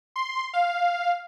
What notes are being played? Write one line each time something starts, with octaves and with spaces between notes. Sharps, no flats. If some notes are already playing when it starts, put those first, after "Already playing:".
C6
F5